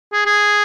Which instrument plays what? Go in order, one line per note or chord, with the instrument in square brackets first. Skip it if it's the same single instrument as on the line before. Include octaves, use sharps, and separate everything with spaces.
[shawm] G#4
G#4